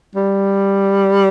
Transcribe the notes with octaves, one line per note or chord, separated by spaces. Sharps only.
G3